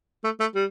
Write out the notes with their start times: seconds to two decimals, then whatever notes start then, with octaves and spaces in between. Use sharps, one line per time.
0.24 A3
0.40 A3
0.55 G3